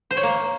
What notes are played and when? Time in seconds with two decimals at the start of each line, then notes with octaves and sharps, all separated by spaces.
0.11 C5
0.17 C#5
0.23 A#3